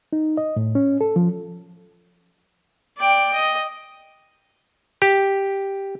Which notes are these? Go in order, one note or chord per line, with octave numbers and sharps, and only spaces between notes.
D#4
D#5
A2
C#4
A4
F3
D5 G5
D#5
G4